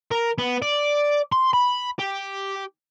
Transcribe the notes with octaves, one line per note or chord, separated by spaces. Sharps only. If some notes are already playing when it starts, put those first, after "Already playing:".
A#4
B3
D5
C6
B5
G4